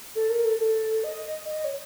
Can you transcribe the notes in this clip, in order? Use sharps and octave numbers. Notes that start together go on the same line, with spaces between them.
A4
A#4
A4
A4
D#5
D#5
C#5